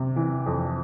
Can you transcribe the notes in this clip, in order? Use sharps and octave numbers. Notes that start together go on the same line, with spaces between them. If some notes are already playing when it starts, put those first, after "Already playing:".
Already playing: C3
E3
F2